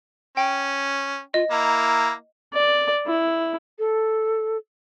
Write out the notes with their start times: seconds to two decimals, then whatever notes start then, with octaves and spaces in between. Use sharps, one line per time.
0.37 C#4 G5
1.34 F4 D#5
1.51 A#3 E4 A#5
2.53 D5
3.06 E4
3.79 A4